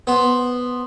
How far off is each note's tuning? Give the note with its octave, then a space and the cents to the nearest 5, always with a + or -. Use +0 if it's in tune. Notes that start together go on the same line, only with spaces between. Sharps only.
B3 +0 C5 +0